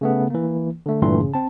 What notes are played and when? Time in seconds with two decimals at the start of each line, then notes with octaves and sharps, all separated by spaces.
0.01 C#3 A3 B3
0.30 E3 A#3
0.86 D3 A3
1.02 G1 G2 A#2 E3 A3 C6
1.20 C#3
1.34 C4 A5